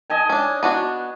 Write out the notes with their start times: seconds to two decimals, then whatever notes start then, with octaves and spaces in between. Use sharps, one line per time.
0.10 D#5 G#5 A5
0.29 C#4 D4
0.63 B3 D4 F#4